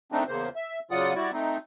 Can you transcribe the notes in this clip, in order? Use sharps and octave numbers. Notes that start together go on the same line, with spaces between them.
D#3 A3 C4 D4 D#4
E2 C#3 A#3 C5
E5
C#3 F#3 F4 D5 F#5 D#6
G3 E4 F#4 D5
A3 C4 D#4